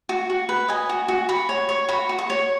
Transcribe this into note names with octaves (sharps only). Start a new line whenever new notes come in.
F#4
F#4
B4
D#5 G#5
F#4
F#4
F#4 B5
C#5
C#5
F#4 B5
F#4
C#6
C#5